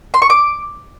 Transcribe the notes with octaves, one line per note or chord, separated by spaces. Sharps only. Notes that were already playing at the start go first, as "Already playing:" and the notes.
C6
C#6
D6